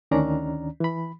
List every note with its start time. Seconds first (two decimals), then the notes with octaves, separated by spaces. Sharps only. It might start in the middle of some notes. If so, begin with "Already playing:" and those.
0.11 D2 D#3 C#4 D4 D5 A#5
0.80 E3 B5